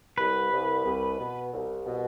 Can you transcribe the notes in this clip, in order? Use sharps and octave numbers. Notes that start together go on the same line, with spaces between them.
C2 B4
C2
C2
B2
C2
B2